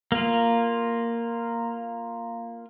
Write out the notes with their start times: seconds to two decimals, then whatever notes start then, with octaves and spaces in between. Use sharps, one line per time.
0.12 A#3 F4